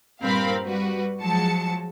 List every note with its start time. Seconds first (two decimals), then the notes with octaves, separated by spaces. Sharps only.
0.22 G2 A#2 C4 A#4 F5 B5
0.67 G3 F#4 B4
1.20 F3 F#3 G#3 A5 C#7